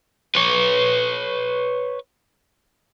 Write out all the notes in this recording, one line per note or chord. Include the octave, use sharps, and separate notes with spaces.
B4 C#5